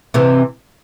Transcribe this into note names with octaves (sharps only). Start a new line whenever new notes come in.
C3 E3